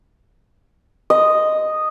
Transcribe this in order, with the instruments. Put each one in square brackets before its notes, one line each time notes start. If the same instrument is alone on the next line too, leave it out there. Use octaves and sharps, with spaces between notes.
[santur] D#5